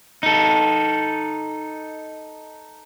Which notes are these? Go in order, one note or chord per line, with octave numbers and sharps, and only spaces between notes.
D#4 A4